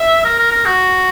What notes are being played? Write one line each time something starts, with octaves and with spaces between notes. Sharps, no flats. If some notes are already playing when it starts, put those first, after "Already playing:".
Already playing: E5
A#4
A#4
A#4
F#4